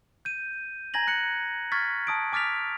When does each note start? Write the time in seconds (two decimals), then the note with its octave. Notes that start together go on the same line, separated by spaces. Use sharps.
0.25 G6 D#7
0.94 G#5 A#5 G#6 A#6 F#7
1.07 F#6 C#7 F#7
1.72 C#6 F6 G#6 A6 B6
2.07 A5 D#6 D7
2.32 G#5 D6 F6 A6 B6 F7